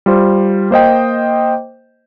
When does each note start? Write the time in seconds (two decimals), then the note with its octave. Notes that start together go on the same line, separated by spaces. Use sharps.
0.06 G3 F4 C5
0.71 A#3 C5 D#5 G5